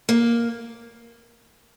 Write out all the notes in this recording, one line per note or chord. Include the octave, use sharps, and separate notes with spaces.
A#3